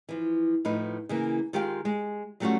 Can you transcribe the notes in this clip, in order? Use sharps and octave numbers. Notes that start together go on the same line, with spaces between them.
E3 F3
A2 F3 D#4 B4
C#3 E3 A#3
D#3 G#3 F4 G4 F5 G5
G#3
F#3 G3 A3 C#4 F4 F#4